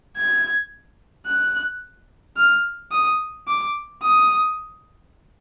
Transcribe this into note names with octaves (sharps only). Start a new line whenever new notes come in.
G#6
F#6
F6
D#6
D6
D#6